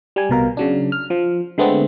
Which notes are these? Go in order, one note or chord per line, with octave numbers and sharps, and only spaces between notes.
G3 G#5
C2 B2 A#4 F5
C#3 F#3 D4
F6
F3
D3 G#3 A3 B3 C4